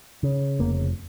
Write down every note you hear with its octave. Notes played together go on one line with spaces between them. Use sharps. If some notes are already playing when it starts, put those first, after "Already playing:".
C#3
F1 A#3